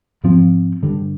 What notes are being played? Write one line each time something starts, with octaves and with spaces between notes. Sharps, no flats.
G#2 F3 C4
G2 D3 G3